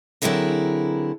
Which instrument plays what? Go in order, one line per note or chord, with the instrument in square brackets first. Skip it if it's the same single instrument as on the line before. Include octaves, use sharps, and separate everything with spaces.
[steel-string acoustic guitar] D3 F#3 C4 E4 G#4 A#4